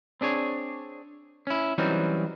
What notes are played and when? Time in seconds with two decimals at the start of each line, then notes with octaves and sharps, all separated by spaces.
0.21 C4 D4 G#4 C#5
1.47 C#4 E4
1.78 E3 F#3 G3 C4 C#4 D#4